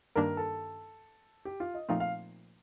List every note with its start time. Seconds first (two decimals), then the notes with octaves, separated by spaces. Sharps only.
0.15 G2 D#3 G3 A#3 D4 A#4
0.37 A4
1.45 G4
1.60 F4
1.74 D#5
1.89 A#2 F3 A3 C4 D#4 F5
2.00 F5